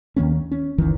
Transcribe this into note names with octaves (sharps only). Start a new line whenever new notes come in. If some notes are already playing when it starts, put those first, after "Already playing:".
D#2 D#3 A#3 C#4
C#4
F#1 C#2 D#3 E3